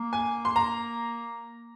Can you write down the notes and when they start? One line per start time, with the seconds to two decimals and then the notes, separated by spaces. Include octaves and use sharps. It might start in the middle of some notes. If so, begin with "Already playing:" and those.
Already playing: A#3
0.13 G#5
0.45 C6
0.56 A#5